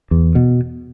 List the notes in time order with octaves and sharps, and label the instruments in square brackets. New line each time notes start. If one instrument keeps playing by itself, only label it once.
[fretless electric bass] E2
B2